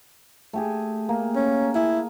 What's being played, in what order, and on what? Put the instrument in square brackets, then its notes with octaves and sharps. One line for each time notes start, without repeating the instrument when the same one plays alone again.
[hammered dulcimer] A3 G4 G#4
A#3
[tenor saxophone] C#4
[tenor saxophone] E4 [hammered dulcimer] G#4